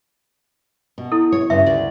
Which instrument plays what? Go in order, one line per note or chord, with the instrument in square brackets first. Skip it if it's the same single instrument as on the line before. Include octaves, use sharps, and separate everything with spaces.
[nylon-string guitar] B2
[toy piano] E4 A4
[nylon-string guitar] C#5
[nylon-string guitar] G2 C#3 [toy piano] E5
[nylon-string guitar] D2 D5